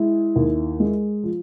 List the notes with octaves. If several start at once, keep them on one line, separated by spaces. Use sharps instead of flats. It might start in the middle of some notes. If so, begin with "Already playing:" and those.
Already playing: G#3 E4
D#2
G#3
F3